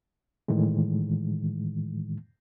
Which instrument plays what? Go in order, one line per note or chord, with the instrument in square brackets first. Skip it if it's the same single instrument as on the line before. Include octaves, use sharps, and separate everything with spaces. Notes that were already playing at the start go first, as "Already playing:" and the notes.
[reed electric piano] A2 D#3 E3 G#3